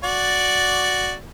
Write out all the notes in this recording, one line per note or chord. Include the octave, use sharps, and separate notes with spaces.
F#4 D5